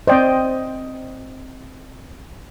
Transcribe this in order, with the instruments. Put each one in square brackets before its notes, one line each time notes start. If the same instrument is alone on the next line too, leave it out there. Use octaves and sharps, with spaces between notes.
[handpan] C4 D#5 [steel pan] C5 D5 G5